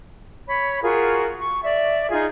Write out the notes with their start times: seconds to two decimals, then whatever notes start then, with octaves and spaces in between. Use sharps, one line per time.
0.47 C#5 B5
0.82 F4 F#4 G#4 A#4
1.41 C#6
1.64 D5 E5
2.10 D#4 F4 G#4